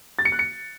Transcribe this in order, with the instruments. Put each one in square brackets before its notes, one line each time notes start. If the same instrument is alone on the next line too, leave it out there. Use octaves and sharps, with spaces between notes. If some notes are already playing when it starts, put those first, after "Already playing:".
[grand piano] A6
C#7
F#6
C#7